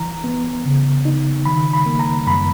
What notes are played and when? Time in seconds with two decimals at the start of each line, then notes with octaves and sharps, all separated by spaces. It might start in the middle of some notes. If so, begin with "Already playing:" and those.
Already playing: E3 A#5
0.24 B3
0.65 C#3
1.05 D#4
1.45 D#3 B5
1.73 B5
1.86 A#3
2.00 A#5
2.26 F#2 B5